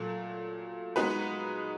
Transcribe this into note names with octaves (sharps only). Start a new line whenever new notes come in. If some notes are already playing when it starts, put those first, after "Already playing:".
Already playing: A#2 F#3 A3
G#3 B3 D#4 F#4 B4